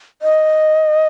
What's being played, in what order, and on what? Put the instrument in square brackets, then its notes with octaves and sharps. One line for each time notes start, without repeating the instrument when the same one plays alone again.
[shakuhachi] D#5